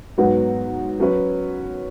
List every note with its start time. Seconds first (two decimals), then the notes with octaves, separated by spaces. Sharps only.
0.18 G#2 F#3 B3 F#4 B4
1.00 F#3 C#4 B4